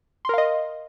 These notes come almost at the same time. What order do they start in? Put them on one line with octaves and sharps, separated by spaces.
C6 A#4 F5 D#5